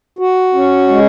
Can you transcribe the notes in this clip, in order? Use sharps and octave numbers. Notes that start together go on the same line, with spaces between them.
F#4
C#4
G#3